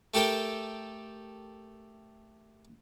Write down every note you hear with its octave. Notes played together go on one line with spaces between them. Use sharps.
A3 G4 A4 A#4 G5